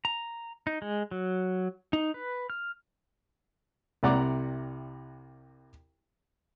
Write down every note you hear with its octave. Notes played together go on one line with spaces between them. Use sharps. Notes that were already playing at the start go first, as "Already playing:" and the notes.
A#5
D#4
G#3
F#3
D#4
B4
F6
C2 C3 D5 F#5 A#5 D6